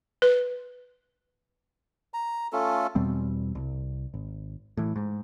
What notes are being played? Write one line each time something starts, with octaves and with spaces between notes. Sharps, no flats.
B4
A#5
A3 C#4 F4 A4
E2 B2 G3 C4
C2
G#1
A2 E3
G#2